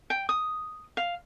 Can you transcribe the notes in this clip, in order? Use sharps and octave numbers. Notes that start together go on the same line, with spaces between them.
G5
D#6
F5